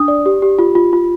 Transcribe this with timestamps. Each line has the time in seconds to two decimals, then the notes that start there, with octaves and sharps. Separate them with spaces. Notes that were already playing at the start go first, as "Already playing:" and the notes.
Already playing: D4 D#6
0.08 D5
0.26 G4
0.42 G4
0.59 F4
0.75 F4
0.93 F4